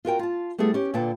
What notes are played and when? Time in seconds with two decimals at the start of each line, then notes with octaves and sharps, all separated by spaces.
0.05 F4 F#4 A#4 G5
0.19 F4 A5
0.58 G3 A3 B3 E4 G#4 A4
0.73 B3 C#4 G4
0.94 A#2 D3 B4 G5 A5